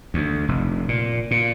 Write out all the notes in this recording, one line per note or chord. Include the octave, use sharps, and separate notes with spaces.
D2
F1
A#2
A#2